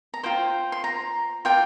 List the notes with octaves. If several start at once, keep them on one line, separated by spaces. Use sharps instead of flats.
A#5
F4 C5 G5
C6
A#5
F4 D5 G5